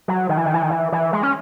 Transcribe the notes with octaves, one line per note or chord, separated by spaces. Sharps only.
F#3
D#3
E3
D#3
E3
D#3
E3
E3
G#3
C#4